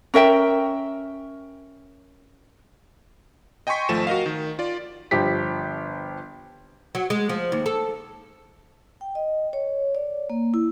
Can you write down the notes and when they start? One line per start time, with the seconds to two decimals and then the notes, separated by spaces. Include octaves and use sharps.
0.14 C#4 A#4 E5 G5
3.67 D#5 G5 G#5 C6 C#6 B6
3.89 G#1 F3 A3 E7
4.07 F#4 A#4 D#5 F5
4.26 D#3
4.59 F4 D5
5.11 G1 F3 G4 B6
6.95 F#3
7.10 G#3
7.29 F3
7.52 D#2
7.66 A4
9.01 G5
9.15 D#5
9.53 C#5
9.95 D5
10.30 A#3
10.54 E4